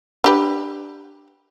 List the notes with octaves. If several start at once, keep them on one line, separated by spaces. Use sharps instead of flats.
D4 G4 B4